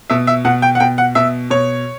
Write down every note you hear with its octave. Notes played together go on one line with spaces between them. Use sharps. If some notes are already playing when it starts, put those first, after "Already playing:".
B2 E5
E5
B2 F#5
G5
F#5
B2 G5
F#5
B2 E5
B2 C#5